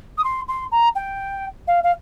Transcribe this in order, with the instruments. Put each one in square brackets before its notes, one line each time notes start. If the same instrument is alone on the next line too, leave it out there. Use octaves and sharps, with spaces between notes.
[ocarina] D#6
C6
C6
A#5
G5
F5
F5